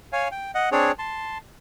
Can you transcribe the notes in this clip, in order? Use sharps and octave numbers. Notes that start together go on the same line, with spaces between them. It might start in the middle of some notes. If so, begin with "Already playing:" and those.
C#5 F5 G#5
G5
D#5 F#5
C4 D4 G#4 C#5
A5 C6